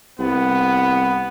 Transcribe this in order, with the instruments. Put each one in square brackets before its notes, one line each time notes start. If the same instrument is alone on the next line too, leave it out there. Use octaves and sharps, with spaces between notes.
[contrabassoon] C2 [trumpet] B3